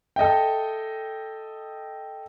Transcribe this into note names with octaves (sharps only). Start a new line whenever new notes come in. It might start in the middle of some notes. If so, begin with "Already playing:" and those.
A4 D#5 E5 G5